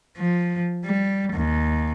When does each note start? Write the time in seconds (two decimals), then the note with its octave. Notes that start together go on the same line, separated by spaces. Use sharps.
0.17 F3
0.85 G3
1.33 D#2